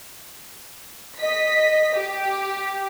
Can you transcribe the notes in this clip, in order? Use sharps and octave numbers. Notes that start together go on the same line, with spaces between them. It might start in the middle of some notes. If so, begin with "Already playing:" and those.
D#5 B6
G4